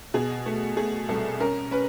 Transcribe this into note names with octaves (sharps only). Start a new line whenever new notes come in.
B2 G#4
A3
A3 G#4
C2 A4
C#4 A#4
C#4 B4